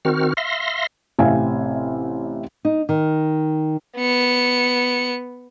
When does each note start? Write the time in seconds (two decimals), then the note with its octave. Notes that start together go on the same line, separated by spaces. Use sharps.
0.05 D#3 C4 F#4 F6
0.37 E5 F5 C6 A#6
1.19 A1 C3 C4 E5 F5 G#5
2.65 D#4
2.89 D#3
3.97 B3 C#7